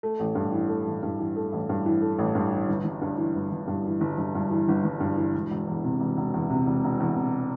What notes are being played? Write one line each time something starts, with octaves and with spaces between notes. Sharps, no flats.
A3
A1
G2
E3
A3
A1
G2
E3
A3
A1
G2
E3
A3
A1
G2
E3
G1
G1
G2
E3
G1
G1
G2
E3
G1
G1
G2
E3
G1
G1
G2
E3
E1
E1
E2
C3
E1
E1
E2
C3
E1
E1
E2
C3